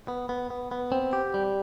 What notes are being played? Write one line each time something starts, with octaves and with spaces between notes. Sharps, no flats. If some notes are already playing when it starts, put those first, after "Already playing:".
B3
B3
B3
B3
C4
G4
G3